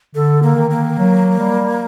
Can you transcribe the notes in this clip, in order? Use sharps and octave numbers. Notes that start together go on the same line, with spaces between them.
D3 A4
A#3
D#3
A#3
F#3
G3